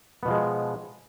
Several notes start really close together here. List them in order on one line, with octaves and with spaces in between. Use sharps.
B3 B2 F3 G#3